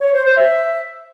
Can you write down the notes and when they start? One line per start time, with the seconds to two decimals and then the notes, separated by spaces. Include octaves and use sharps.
0.01 C#5
0.13 C5
0.25 C5
0.37 E5